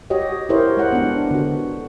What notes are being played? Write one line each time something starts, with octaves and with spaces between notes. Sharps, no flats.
F#4 G4 C#5 D#5
E4 G4 A#4 C5 C#5
G#3 C#5 F#5
B3 D4
D3 F#4